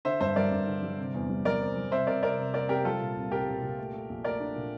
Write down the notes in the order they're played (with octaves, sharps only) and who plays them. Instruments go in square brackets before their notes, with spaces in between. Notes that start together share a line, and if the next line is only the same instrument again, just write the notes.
[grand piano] D3 [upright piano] C5 E5
[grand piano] G2 [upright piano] C5 E5
[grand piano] G3 [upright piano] A#4 D5
[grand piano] G2
D3
G3
C3
E2
G3
[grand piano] G3 [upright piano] A#4 D5
[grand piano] C4
G3
[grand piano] C3 [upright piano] C5 E5
[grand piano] C3 [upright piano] A#4 D5
[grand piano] C3 [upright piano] A#4 D5
[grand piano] C3
[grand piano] A#3 [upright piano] A#4 D5
[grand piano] C3 [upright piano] G4 A#4
[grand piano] G3 [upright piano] F4 A4
[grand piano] A#2
C2
[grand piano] C2 [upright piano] G4 A#4
[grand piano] A#2
A#2
A3
A3
A#1
[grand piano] A3 [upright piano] A#4 D5
[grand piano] D4
A#2